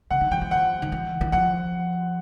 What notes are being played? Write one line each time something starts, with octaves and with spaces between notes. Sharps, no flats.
C#3 F#5
D#3
E3 G5
E3
F3 F#5
D#3
E3
E3
F3 F#5